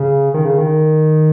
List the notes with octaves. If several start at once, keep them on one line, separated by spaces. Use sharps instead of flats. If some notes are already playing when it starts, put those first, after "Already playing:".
Already playing: C#3
D#3
C#3
D#3